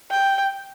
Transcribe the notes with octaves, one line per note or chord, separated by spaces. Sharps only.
G5